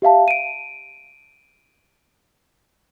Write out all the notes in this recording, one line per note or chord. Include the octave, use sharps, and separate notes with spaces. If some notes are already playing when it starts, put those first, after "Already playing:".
G4 E5 F5 A5
D7 D#7